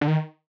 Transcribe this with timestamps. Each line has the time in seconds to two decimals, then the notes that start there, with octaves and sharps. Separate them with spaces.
0.01 D3
0.08 D#3